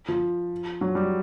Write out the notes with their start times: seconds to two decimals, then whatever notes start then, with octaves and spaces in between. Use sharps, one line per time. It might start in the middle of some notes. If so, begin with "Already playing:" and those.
0.08 F3
0.81 F#3
0.95 G3